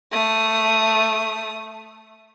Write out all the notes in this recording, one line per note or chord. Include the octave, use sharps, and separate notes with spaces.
A3 D#6